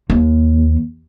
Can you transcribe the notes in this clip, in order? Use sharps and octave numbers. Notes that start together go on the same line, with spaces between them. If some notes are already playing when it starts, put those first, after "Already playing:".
D#2